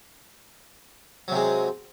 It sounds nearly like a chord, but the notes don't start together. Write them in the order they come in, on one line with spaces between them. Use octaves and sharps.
F#3 C3 G#3